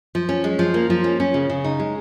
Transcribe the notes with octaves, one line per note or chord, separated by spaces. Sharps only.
F3
C#4
G#3
F3
A#3
F3
C#4
C#4
C#3
C#3
D#4
G#3